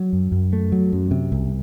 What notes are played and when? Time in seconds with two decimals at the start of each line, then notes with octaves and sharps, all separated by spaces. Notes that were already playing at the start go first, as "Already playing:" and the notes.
Already playing: F#3
0.13 F#2
0.32 F#2
0.53 A3
0.72 F#3
0.92 F#2
1.11 C3
1.32 C2